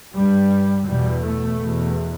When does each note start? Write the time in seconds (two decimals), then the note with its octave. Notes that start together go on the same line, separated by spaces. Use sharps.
0.14 G2 G3
0.86 E2 B2 G3
1.22 A3
1.58 E2 B2